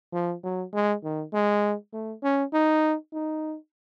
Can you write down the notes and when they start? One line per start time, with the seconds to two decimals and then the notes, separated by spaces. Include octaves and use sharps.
0.13 F3
0.43 F#3
0.73 G#3
1.04 D#3
1.33 G#3
1.93 A3
2.23 C#4
2.53 D#4
3.14 D#4